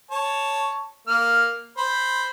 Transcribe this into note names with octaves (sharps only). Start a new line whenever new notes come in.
C#5 A5
A#3 F6
C5 B5